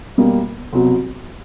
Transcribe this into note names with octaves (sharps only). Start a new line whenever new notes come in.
B2 G3 A#3
C2 B2 F#3